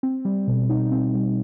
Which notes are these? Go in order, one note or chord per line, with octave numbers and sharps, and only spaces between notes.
C4
G3
B2
D#4
C4
G3